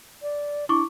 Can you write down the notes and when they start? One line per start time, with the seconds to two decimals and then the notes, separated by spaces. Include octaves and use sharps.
0.22 D5
0.69 D4 E4 C#6 D6